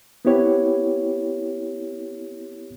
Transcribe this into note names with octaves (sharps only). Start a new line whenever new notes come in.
B3 C4 E4 G4 C#5